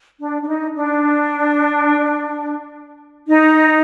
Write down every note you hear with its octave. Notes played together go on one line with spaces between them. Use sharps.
D4
D4
D#4
D4
D#4